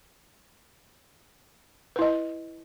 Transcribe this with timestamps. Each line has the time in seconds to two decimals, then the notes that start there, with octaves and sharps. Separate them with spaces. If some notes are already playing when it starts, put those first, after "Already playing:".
1.96 B4
1.99 E4
2.02 D#5